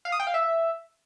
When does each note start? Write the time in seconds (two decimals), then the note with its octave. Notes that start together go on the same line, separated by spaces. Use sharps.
0.05 F5
0.12 D#6
0.20 G5
0.27 F5
0.34 E5